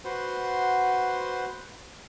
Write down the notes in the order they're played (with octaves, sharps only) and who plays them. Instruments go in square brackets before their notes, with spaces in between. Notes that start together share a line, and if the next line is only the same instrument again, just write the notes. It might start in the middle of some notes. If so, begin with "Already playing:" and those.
[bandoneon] F#4 B4 C5 F#5 C6